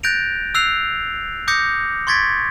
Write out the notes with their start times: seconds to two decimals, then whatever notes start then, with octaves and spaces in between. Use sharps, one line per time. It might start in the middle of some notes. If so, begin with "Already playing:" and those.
0.03 F#6 G6 A6 A#6 D7 F7
0.55 E6 F#6 C7 F7
1.48 D6 D#6 G6 A#6 C#7
2.07 C6 C#6 G#6 A6 B6 D7